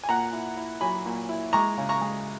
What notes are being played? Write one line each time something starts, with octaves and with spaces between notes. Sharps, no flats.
G#5
A#2 F#5 A#5
E4
E4
F#3 G#5 B5
A#2
E4
G#3 A#5 C#6
C#3
A#5 C#6
G#3